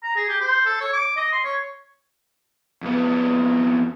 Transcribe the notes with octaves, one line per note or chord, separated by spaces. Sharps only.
A#5
G#4
G4
C5
A4
C#5
D6
D#5
C6
C#5
F2 B3